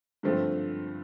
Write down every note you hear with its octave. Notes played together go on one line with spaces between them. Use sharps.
G2 D3 F3 A3 C4